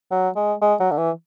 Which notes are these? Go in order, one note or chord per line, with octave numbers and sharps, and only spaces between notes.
F#3
G#3
G#3
F#3
D3
E3